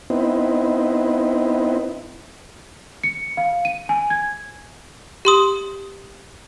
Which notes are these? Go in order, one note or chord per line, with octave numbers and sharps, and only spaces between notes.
B3 C4 D#4 E4
C#7
F5
D#7
G#5
G#6
G4 C6 D#6